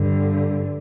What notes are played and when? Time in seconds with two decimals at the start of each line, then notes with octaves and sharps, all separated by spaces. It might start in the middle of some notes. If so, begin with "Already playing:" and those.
Already playing: G2 D3